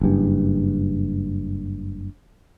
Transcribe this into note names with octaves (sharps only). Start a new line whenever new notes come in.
F#1 G2